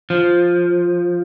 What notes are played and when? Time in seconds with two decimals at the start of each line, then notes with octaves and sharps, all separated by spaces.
0.10 F3